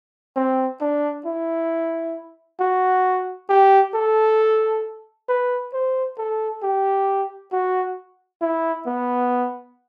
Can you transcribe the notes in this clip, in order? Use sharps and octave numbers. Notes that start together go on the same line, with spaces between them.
C4
D4
E4
F#4
G4
A4
B4
C5
A4
G4
F#4
E4
B3